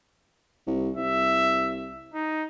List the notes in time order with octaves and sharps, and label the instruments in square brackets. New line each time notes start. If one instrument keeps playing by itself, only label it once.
[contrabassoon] C2
[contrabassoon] C2 [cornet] E5
[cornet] D#4